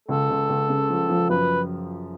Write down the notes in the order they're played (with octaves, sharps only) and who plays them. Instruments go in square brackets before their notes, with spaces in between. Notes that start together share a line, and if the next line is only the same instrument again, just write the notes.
[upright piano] C#2 [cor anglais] A4
[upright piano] C#2
C#2
C#3
F3
F3
[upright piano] F#2 [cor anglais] B4